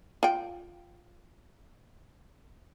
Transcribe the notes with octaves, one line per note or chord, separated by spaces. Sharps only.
F4 G5